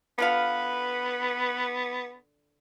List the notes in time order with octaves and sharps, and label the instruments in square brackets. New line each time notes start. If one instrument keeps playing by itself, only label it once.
[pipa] D3 F4 F5 [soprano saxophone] B3 [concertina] B4 B5